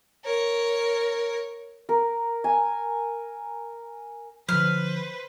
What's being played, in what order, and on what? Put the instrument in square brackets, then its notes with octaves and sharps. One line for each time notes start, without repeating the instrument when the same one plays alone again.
[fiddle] A#4 C#5
[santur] A#4
G#5
[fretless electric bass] D3 F3 [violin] B4 C5 [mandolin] F6